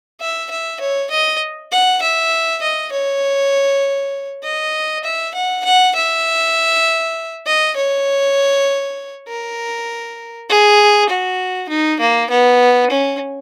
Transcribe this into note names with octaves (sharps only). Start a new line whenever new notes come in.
E5
E5
C#5
D#5
F#5
E5
D#5
C#5
D#5
E5
F#5
F#5
E5
D#5
C#5
A#4
G#4
F#4
D#4
A#3
B3
C#4